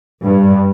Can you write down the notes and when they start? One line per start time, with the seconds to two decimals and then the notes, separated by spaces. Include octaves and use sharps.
0.23 G2